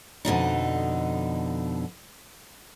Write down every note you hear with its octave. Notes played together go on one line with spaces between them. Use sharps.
F2 B2 D3 D#4